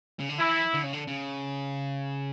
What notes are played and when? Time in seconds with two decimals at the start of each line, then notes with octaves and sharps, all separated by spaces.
0.19 C#3
0.29 D3
0.39 E3 E4
0.74 D3
0.83 C#3
0.93 D3
1.07 C#3